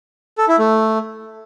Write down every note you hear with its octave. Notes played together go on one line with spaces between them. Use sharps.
A4
E4
A3